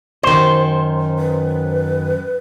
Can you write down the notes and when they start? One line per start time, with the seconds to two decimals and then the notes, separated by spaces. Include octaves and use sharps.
0.23 F#2 D#3 C5
1.19 B4